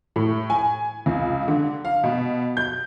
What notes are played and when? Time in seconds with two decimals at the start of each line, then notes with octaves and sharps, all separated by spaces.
0.16 A2
0.50 G#5
1.06 C#2
1.48 D3
1.85 F5
2.03 B2
2.57 G6